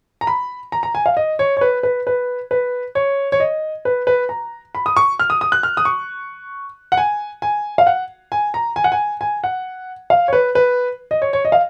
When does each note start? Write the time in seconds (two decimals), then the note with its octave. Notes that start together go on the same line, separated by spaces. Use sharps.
0.21 A#5
0.27 B5
0.72 A#5
0.83 A#5
0.95 G#5
1.06 F5
1.17 D#5
1.39 C#5
1.57 C#5
1.61 B4
1.83 B4
2.07 B4
2.51 B4
2.95 C#5
3.32 C#5
3.40 D#5
3.85 B4
4.07 B4
4.29 A#5
4.75 B5
4.86 D#6
4.97 C#6
5.19 F6
5.30 D#6
5.41 D#6
5.52 F#6
5.63 F6
5.77 D#6
5.85 C#6
6.92 F#5
6.97 G#5
7.42 G#5
7.78 F5
7.87 F#5
8.32 G#5
8.54 A#5
8.76 G#5
8.84 F#5
8.92 G#5
9.21 G#5
9.44 F#5
10.10 F5
10.28 C#5
10.33 B4
10.55 B4
11.11 D#5
11.22 C#5
11.33 C#5
11.45 D#5
11.52 F5